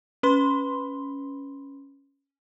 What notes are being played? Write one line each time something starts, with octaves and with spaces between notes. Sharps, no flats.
C#4 B4 B5 C6 G7